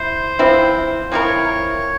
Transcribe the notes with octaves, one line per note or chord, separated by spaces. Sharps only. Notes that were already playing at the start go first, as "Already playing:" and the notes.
Already playing: E4 C5
F3 C4 E4
F3 C4 E4 A#4 C#5